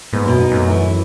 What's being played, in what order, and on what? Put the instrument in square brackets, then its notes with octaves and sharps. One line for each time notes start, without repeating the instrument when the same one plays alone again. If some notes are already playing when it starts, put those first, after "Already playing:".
[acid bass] G#2 [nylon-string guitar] B3
[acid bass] F#2 [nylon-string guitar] B2
[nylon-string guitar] D#4
[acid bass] F#2 [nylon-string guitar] A3
[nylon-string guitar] E3
E3